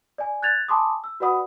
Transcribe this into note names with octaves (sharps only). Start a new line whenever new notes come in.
D5 G#5
F#6 G#6 A6 F7
G#5 A5 B5 C6 D6 D#6
E6
F#4 B4 D5 F#5 B5 D#6